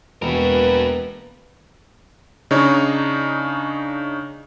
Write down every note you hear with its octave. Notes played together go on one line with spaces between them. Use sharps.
E1 A#3 F#4 A#4 B4
C#3 D4 D#4 C#5